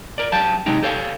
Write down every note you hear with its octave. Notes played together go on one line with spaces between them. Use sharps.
A#4 D5
F#3 G4 F5 G5 A5
C3 F#3 G#3 D#4 G4
G4 A4 C#5 F5